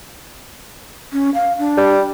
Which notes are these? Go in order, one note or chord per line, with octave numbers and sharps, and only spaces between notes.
C#4
F5
D4
G3